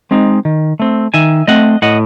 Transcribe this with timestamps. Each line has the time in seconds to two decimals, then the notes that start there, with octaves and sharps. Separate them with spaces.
0.11 G#3 C4 D#4
0.45 D#3
0.80 A3 C4
1.14 D#3 E5 G#5
1.47 A3 C4 D#5 F#5
1.82 A2 D#5 F#5